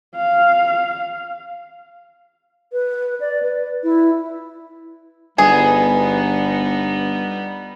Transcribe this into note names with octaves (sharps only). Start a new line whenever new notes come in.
F5
B4
D5
B4
E4
G1 G3 B3 D#4 G#4